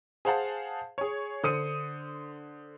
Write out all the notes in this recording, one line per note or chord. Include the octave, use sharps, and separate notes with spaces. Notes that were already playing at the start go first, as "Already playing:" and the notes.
G#4 C5 F5 F#5 A5
G#4 C#5
D3 C5 D#6 C#7 D#7